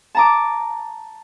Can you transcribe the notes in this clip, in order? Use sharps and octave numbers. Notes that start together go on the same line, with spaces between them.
A5 A#5 D6